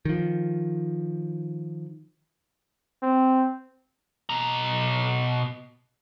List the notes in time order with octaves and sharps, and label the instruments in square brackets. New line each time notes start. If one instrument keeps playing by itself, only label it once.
[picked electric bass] D#3 F3
[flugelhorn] C4
[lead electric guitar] B2 A#5